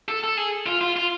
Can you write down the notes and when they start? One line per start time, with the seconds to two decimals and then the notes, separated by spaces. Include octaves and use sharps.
0.09 A4
0.24 A4
0.37 G#4
0.66 F4
0.81 F4
0.96 F4